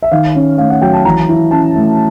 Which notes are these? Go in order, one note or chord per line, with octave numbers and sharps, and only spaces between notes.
E5
D#3 F5
C#4
A3 F5
F#5
F#3 G5
A5
E3 A#5
E4
C#4 A5
A3